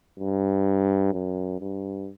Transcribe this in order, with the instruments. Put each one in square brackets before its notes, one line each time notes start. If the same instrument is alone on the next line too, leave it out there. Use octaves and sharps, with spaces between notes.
[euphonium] G2
F#2
G2